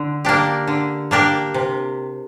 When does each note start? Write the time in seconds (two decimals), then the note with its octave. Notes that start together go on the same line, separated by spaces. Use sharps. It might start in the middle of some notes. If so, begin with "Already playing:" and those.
Already playing: D3
0.25 A#3 D4 G4
0.67 D3
1.11 A#3 D4 G4 A#4
1.54 C3